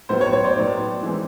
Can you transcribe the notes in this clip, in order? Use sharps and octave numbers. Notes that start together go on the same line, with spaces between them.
A2 F#3 B3 D#4 C5
C#5
C#5
C5 D5
A2 F#3 B3 D#4
E3 G#3 C4 D#4